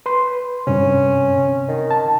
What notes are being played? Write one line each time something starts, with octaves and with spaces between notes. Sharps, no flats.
B4 C6
G2 C3 C#4
C3
D#3
A5